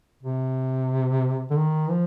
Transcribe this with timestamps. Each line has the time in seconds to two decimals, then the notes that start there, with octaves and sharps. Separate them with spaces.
0.23 C3
1.50 D3
1.56 D#3
1.90 F3